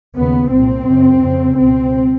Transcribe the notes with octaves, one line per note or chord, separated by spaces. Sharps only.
D#2 C#3 B3
C2 A#2 C4
F#2 C#3
F2 C#3
C#2 B2 C4